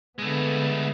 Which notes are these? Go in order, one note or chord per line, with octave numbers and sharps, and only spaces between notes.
D3 G#3 A3 B3